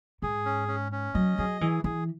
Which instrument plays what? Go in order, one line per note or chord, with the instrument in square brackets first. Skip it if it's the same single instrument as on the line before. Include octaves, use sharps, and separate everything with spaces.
[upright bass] G#2 [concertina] G#4
[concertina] C#4
C#4
C#4
[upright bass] F#3 [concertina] D#5
[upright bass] F#3 [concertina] G#4
[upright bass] E3 [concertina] G#4
[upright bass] E3 [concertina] G#4